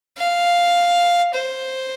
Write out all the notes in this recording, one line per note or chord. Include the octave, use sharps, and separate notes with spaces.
F5
C5